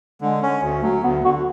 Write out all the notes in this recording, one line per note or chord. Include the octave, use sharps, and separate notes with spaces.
D3 G#3
C#4
D2
F#3 A3
D2 B3
D3 F#4